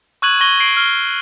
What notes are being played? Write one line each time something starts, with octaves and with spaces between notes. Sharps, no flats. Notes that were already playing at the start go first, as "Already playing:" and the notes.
C#6 E6 F#6 G#6 D#7 F#7
C#6 A#6 D#7 G7
C7 D7 F#7
F6 G7